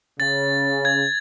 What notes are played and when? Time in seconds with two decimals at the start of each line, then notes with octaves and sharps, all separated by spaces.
0.20 C#3 A6
0.85 G#6